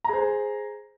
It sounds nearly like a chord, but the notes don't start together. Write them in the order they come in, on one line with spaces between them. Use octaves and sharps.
A#5 G#4 C5